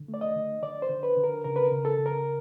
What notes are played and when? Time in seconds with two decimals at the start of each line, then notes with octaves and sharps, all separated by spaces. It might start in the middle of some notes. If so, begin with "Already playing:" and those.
Already playing: D3
0.08 A3
0.14 D5
0.21 D#5
0.36 D3
0.63 D3 D5
0.82 C5
0.89 D3
1.03 B4
1.17 D3
1.24 A#4
1.44 C#3 A#4
1.56 B4
1.65 A#4
1.71 C#3
1.85 A4
1.99 C#3
2.06 A#4